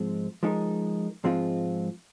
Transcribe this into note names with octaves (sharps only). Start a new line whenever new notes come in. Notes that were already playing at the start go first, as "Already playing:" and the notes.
Already playing: G#2 F3 G#3 C4
F3 G#3 D#4 A#4
G#2 F3 G#3 C4 F4